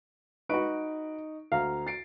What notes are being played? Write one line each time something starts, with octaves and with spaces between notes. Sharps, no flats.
D#4 F#4 B4 C#6 D7
D2 F5 A#5
A6 C7 D7